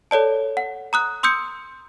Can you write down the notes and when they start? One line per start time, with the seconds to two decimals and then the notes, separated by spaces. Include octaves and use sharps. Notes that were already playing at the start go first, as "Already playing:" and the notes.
0.11 A4 C#5 D5 A5
0.57 F#5
0.93 A#5 D#6 F#6
1.23 C6 D#6 E6 G6 C#7